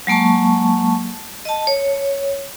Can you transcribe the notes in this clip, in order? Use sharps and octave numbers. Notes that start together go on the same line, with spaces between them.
F#3 G#3 A#3 A5 C#6
D#5 A5
C#5